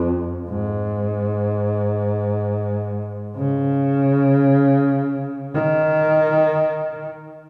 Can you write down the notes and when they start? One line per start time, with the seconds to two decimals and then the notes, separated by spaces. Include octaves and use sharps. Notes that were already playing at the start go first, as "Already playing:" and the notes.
Already playing: F2
0.48 G#2
3.37 C#3
5.54 D#3